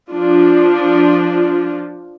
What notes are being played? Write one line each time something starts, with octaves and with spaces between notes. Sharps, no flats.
F3 D4 F4